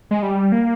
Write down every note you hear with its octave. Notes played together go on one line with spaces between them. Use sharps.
G#3
G3
A#3